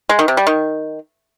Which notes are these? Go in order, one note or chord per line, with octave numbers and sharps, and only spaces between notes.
G#3
D#3
C3
G3
D#3